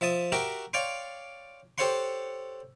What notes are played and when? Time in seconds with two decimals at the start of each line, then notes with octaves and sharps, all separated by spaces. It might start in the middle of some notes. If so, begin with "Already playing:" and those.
0.01 F3 E5 A5 D#6
0.32 F#4 G4 A#4 E5 G5
0.73 C#5 D5 F5 G5 C6
1.78 G4 A4 C5 C#5 F#5 C6